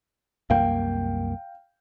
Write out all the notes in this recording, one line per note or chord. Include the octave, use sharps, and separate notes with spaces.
C2 F#2 A#3 F5 G5